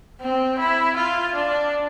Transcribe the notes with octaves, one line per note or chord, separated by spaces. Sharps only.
C4
E4
F4
D4